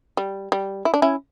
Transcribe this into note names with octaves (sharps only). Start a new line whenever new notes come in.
G3
G3
E4
D4
C#4 E4